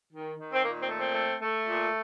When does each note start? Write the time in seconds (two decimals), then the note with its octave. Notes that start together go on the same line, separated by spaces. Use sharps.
0.13 D#3
0.38 D#3
0.52 C4
0.63 A#2 A#3
0.81 C4
0.89 A3
0.98 C4
1.15 A3
1.41 A3
1.66 A#2